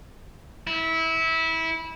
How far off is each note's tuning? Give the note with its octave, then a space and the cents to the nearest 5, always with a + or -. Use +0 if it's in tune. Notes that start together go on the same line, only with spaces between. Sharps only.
E4 -20